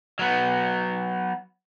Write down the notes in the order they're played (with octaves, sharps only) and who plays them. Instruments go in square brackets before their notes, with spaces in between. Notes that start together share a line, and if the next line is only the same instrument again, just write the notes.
[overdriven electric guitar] F#3 B3